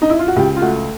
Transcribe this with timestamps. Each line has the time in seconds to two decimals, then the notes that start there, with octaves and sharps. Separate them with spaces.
0.02 D#4
0.10 E4
0.19 F4
0.28 F#4
0.36 C#2 G4
0.56 F4
0.61 A3 F#4